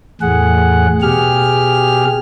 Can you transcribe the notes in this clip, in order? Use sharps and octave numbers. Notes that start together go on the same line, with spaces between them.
E2 A2 G#4 F#5
B2 G4 G#4 F6